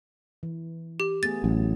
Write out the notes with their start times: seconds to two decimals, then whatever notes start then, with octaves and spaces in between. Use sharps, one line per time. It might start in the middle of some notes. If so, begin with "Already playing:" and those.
0.43 E3
1.00 G4
1.23 A3 B3 G#4 A6
1.44 A1 F#3